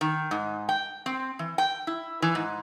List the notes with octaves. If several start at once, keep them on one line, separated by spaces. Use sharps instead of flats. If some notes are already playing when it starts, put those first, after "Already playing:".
D#3
G#2
G5
C4
E3
G5
E4
E3
G#2